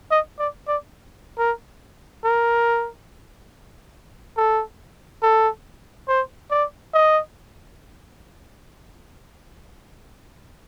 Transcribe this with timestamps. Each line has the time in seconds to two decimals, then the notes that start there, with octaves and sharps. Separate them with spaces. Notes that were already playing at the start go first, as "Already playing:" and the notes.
0.11 D#5
0.39 D5
0.68 D5
1.38 A#4
2.25 A#4
4.37 A4
5.23 A4
6.08 C5
6.51 D5
6.94 D#5